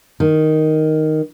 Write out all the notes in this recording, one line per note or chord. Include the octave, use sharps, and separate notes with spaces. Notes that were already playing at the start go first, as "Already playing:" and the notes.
D#3